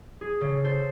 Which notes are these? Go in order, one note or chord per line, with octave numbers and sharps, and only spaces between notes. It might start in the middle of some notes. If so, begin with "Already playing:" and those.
G#4
C#3 A4
A4 C5